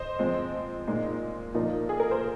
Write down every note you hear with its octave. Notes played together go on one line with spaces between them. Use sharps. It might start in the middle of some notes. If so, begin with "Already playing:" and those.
Already playing: C5 D#5
F3 G#3 C4
A#2 G#3 D#4
A#2 F3 A#3 D#4
G#4
A#4
C5